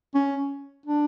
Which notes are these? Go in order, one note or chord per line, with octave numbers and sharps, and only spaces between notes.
C#4
D4